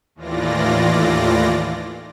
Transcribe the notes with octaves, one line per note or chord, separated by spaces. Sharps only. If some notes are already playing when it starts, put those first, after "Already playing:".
D#2 A2 E3 F4 D5 A#6